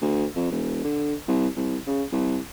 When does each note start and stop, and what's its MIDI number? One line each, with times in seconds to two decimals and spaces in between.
0.02 0.26 38
0.36 0.47 41
0.51 0.80 28
0.85 1.15 50
1.28 1.48 36
1.56 1.77 36
1.87 2.03 49
2.12 2.38 36